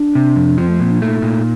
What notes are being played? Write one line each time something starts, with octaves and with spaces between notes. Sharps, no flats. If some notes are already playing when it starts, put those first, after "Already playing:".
Already playing: D4
C3
F2
F3 C4
A3
A#2 C4
D4
A3 D#4
A#2